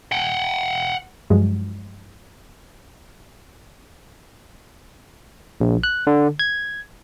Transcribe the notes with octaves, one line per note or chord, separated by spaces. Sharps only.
F#5 G5
G2 F3 F#3 G#3
A#1
F#6
D3
G#6